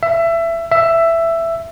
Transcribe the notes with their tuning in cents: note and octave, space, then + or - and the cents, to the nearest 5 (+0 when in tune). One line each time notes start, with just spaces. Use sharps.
E5 +20
E5 +10